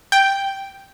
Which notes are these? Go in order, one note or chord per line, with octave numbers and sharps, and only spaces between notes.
G5